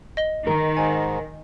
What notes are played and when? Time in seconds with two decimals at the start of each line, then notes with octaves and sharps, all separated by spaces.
0.17 D#5 G7
0.47 D#3 A#4
0.77 G#2 G#5